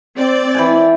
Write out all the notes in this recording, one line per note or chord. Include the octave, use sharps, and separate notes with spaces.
C4 D5
E3 G5 G#5